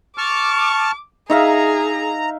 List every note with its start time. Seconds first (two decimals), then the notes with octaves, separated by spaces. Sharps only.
0.18 A5 C#6 D6 F6
1.30 D#4 G#4 E5 F5 A#5